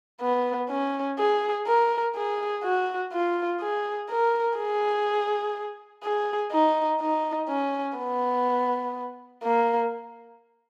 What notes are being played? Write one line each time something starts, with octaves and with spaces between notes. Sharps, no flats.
B3
C#4
G#4
A#4
G#4
F#4
F4
G#4
A#4
G#4
G#4
D#4
D#4
C#4
B3
A#3